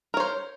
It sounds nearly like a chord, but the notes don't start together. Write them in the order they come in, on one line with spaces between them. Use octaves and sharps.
A#4 C#5 C5